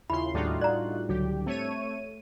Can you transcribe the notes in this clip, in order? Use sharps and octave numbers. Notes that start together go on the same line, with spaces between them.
D#2 C#3 E4 F4 B5 C6
D#2 A2 G3 D4 D#4 F4 F#4
D5 A#5 F#6
C#2 D3 F#3 G4
A3 C4 C#5 D#7